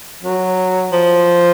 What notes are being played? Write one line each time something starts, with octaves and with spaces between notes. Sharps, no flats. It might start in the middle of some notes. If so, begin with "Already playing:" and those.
F#3
F3